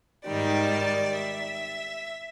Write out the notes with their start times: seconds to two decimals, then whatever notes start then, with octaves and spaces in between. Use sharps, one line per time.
0.25 G#2 D#3 G3 D5
1.17 E5